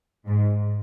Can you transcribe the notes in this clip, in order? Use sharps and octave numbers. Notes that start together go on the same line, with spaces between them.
G#2